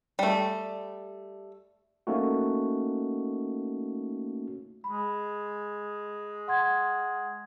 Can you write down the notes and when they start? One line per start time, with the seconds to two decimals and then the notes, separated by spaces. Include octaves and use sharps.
0.19 G3 A3
2.07 A3 A#3 C#4 D#4 F#4
4.84 G#3 B5
6.48 F#5 C6 G#6